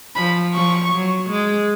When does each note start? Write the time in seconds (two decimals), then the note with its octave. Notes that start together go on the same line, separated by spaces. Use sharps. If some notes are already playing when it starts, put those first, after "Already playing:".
0.16 F3 B5
0.54 F3 C#6
0.93 F#3
1.30 G#3